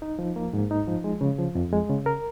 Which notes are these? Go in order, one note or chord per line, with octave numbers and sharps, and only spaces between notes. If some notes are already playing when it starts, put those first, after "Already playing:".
D#4
F3
A#3
G#2
D#4
F3
G#3
C#3
F3
F2
G#3
C#3
A#4